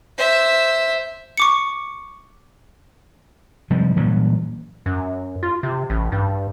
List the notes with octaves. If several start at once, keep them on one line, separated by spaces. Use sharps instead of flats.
C5 E5
C#6 D6 C#7
C3 F3 G3 G#3
A#2 E3 F#3 G3
F#2
F4
C3
A1
G2